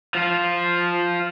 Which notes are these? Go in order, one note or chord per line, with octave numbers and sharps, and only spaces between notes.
F3 F4